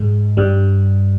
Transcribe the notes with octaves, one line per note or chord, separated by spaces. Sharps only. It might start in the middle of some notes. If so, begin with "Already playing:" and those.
Already playing: G#2 G#3
G2 G3